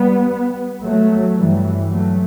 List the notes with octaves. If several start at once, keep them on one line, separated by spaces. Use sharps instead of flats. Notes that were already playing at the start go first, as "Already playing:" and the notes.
Already playing: G3 B3
F#3 A3
G2 E3 G3
F#3 A3